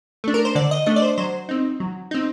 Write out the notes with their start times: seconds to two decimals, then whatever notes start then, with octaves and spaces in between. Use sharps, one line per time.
0.24 A3 D4
0.34 A#4
0.45 C5
0.55 D3 D5
0.71 D#5
0.86 A3 D4 D#5
0.96 D5
1.02 C5
1.18 F#3 C5
1.49 C4 D#4
1.80 F#3
2.11 C4 D#4